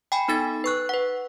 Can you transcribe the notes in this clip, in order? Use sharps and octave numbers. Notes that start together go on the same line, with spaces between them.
G5 G#5 B5
B3 D#4 A4 A6
B4 C#6 F#6
B4 F#5